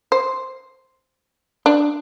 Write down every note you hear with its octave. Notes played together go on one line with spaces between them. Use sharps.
C5
D4